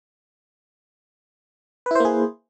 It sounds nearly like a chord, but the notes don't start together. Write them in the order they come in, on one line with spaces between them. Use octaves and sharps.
B4 E4 C5 A#3 G#4